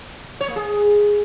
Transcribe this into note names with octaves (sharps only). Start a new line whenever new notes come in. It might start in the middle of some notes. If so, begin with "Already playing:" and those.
C#5
A#3
G#4